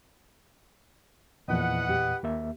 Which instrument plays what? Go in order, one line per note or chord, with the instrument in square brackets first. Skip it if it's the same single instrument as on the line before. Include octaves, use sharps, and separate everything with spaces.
[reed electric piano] E2 A#2 [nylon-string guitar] F3 E4 [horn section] B4 D#5 F#5
[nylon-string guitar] G4
[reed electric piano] D#2 A#3 E5